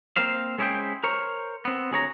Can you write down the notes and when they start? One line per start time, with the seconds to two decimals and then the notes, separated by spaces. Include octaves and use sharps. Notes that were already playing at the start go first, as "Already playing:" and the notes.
0.16 A#3 C4 C5 F5
0.58 G#3 C#4 E4 G#4 C5 G5
1.04 A#4 C5 C#5
1.65 B3 C4
1.91 D2 G#4 C#5 A#5